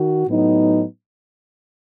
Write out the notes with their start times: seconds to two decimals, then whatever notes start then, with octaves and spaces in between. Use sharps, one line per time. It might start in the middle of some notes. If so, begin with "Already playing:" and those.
Already playing: D#3 F#4
0.27 A2 F#3 B3 D#4